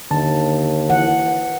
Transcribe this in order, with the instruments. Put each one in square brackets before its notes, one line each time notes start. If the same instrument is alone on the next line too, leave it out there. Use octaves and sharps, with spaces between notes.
[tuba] D#2 [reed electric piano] D3 A5
[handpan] E3 F#5